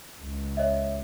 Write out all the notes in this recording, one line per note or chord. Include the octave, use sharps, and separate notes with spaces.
C#2
C#5 D#5 E5